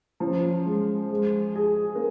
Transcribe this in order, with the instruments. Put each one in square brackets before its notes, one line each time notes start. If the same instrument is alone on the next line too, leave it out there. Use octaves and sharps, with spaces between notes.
[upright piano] F3 [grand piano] C#4
[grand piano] G#3
G#3
G#4
[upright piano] A#3